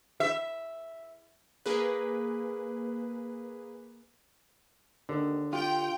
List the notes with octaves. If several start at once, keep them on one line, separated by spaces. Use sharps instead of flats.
E5
A#3 G#4 B4
D#2 D3
F4 G4 G5